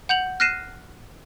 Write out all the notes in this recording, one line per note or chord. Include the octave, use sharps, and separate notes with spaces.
F#5 G6 F7 F#7
F6 F#6 A#6 C7 D#7 E7